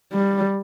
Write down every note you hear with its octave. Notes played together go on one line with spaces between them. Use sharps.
G3